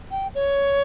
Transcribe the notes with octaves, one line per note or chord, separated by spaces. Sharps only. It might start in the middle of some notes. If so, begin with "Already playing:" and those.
G5
C#5